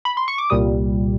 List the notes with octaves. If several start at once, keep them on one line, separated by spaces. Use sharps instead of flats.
B5
C6
C#6
D6
C2 A#2 G3 D#6